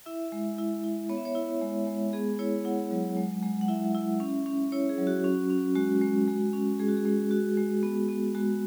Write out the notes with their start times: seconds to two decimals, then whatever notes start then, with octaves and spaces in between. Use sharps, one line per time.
0.06 E4 E5
0.32 G#3
0.58 E4
0.84 E4
1.09 B3 C#5
1.17 E5
1.25 C#5
1.35 E4
1.62 G#3
1.87 G#3
2.13 B3 G#4
2.39 E4 C#5
2.65 E4 F#5
2.91 F#3
3.16 G#3
3.43 G#3
3.61 F#5
3.68 E4 E5
3.95 E4
4.20 C#4
4.46 C#4
4.72 E4 C#5
4.89 G#4
4.98 F#3
5.07 F#4
5.24 C#4
5.50 C#4
5.75 G#3 F#4
6.02 G#3
6.28 G#3
6.53 C#4
6.79 G#3 G#4
6.88 F#4
6.97 G#4
7.05 G#3
7.31 F#4
7.57 G#3
7.83 B3
8.09 B3
8.35 G#3 F#4